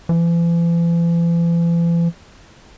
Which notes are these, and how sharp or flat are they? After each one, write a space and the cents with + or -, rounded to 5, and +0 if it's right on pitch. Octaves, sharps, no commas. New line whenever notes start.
E3 +45